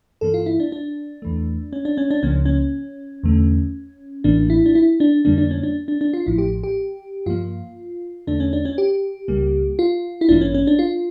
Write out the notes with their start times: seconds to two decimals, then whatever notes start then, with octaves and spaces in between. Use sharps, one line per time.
0.21 G2 E3 A#3 A4
0.34 F4
0.46 E4
0.60 D4
0.72 D4
1.22 E2 E3 A3
1.73 C#4
1.85 D4
1.97 C#4
2.11 D4
2.23 C#2 C#3 F3 A#3 C#4
2.45 C#4
3.23 E2 D3 A3
4.24 A1 A2 E3 A#3 D4
4.50 E4
4.66 D4
4.75 E4
5.00 D4
5.25 F2 D3 G3 A#3 D4
5.38 D4
5.51 C#4
5.63 D4
5.88 D4
6.01 D4
6.14 F4
6.26 A1 A2 F3 E4
6.38 G4
6.63 G4
7.26 G2 F3 A#3 F4
8.27 E2 D3 A3 D4
8.40 C#4
8.53 D4
8.65 C#4
8.78 G4
9.28 C#2 C#3 G3 A#3
9.79 F4
10.21 E4
10.29 A1 G2 E3 A#3 D4
10.41 C#4
10.54 C#4
10.67 D4
10.79 F4